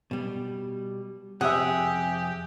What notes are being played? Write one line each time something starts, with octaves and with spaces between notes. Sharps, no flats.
B2 G3
F2 C3 G4 G#4 E5 F#5